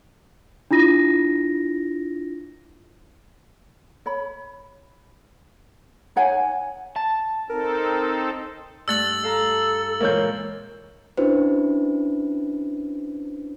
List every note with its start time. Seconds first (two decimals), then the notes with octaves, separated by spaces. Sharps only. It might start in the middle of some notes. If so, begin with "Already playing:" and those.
0.71 D4 E4 F4 A#6
4.06 C#5 B5
6.16 D#4 C#5 F#5 G#5
6.96 A5
7.50 C4 D#4 A4 A#4
8.88 G2 A3 E6 F#6 A6 F#7
9.23 A4 F5 A5 A#5
10.00 A#2 E3 G#3 A#3 C#5 G6
11.17 C#4 D4 E4 F#4 B4 C5